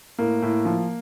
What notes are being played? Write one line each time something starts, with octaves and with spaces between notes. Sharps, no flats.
A2 A#3
A2
F3